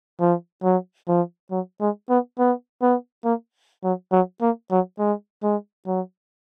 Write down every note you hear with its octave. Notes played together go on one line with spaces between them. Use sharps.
F3
F#3
F3
F#3
G#3
B3
B3
B3
A#3
F#3
F#3
A#3
F#3
G#3
G#3
F#3